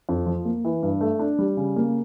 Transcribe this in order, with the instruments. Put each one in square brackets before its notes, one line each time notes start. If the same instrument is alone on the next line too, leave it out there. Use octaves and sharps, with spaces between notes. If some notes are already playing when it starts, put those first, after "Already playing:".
[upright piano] F2
F3
A#3
E3
G2
A3
D4
G3
C#3
A#3